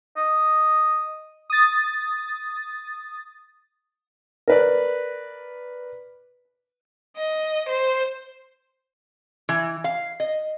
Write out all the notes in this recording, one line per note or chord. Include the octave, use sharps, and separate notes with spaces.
D#5
D#6 A6
A#4 B4 D5
D#5
C5
E3
F5
D#5